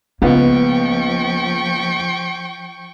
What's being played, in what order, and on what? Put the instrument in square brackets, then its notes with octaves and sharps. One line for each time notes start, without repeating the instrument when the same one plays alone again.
[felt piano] C#2 B3 [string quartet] F3 G5 C#6 [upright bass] A#3 F4